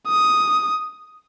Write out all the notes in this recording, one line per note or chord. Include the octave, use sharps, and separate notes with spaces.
D#6